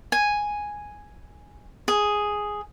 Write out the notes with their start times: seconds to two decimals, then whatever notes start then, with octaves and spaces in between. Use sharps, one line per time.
0.12 G#5
1.88 G#4